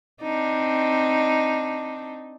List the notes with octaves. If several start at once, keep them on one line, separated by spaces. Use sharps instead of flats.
C4 D4 D#4